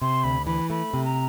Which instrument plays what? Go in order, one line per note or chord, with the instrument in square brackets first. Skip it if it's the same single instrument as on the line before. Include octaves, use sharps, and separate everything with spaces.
[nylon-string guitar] C3 [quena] C6
[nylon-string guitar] D2 [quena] B5
[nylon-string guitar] E3 [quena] B5
[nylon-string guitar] A3 [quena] B5
[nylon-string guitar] C3
[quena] A#5